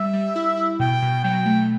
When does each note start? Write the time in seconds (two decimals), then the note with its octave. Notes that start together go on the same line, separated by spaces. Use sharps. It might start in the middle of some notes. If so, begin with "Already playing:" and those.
Already playing: G3 E5
0.13 G3
0.36 E4
0.57 E4
0.80 B2 G5
1.02 B2
1.24 F#3 G5
1.46 A3